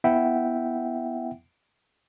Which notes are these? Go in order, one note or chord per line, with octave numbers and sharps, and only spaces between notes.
B3 E4 E5 F#5 G5